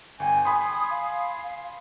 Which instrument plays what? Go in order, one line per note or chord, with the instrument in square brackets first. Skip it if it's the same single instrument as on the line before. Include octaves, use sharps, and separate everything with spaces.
[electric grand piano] G1 G5 [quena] G#5
[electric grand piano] G#5 B5 C6 [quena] D#6
[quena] F5